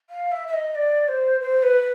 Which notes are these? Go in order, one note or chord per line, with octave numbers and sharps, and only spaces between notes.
F5
E5
E5
D#5
D5
C5
C5
B4